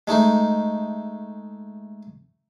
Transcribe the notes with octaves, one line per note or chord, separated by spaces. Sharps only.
G#3 A3 D#4